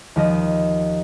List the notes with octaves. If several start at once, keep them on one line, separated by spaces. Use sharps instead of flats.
D#2 F3 D#5 A#6